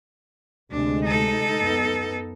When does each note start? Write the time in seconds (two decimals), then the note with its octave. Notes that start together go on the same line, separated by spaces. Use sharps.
0.71 D2 C3 G#3 D4
1.05 D#4 A4
1.60 F#2 B3